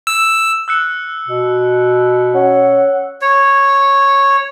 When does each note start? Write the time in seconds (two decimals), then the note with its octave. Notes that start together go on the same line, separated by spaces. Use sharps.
0.07 E6
0.68 E6 F#6 C#7
1.28 B2
2.34 C#4 F#5
3.21 C#5